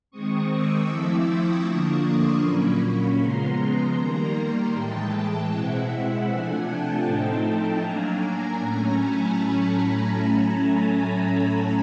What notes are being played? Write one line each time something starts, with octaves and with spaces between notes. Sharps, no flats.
D#3 G#3 C4 C#6 D#6
D6 E6
F3 A3 C4 E4
C#6 D#6
D3 F3 A#3 D4
C6 D6
A#2 F#3 A#3 C#4 B5 C#6
C#3 F3 G#3 B3 A#5 C6
D#3 G3 A#3
A2 E3 G#3 G5 A5
B2 G#3 C4 E4 E5 F#5
E5 F#5
C3 F3 A3 D4 F#5 G#5
G5 A5
A2 F3 A3 C4 D#4
F#3 A#3 D4 G#5 A#5
A2 F#3 A3 C#4
A5 B5